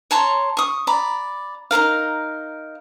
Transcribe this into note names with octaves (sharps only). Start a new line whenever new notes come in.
C#5 A5 A#5 C6
C#6 D#6
D5 A#5 B5
D#4 E4 A#4 F5